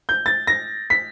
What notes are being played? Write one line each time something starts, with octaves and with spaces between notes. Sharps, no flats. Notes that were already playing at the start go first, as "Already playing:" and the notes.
G6
A6
A#6
B6